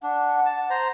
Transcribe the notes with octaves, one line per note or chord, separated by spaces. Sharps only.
D4 F#5
A5
C5 A#5